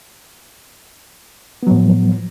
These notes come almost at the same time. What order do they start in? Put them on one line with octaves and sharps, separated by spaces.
B3 F#3 A2 F3